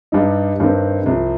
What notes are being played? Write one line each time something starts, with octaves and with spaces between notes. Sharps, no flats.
G2 G3 D#4
G2 D#3 C4
C2 C3 F3